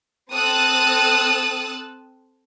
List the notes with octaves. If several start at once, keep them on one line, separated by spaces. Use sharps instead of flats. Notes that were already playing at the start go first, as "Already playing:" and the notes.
C4 A4 D#6 E6 F#6 A6